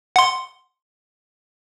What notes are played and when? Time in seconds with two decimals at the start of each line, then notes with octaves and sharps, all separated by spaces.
0.16 F#5 C6